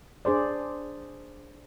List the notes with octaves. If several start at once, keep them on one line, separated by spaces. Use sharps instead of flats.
D4 G#4 C5 D5